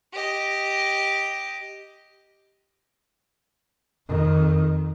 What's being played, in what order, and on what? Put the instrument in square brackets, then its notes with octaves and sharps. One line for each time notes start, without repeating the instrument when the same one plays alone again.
[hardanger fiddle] G4 D#5
[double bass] F2 D#3